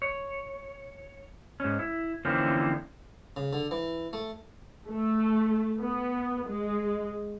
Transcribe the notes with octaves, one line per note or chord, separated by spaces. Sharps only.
C#5
G#2 C#4
E4
D3 E3 F3 A#3 C4 C#4
C#3
D3
E3
A3
A3
B3
G#3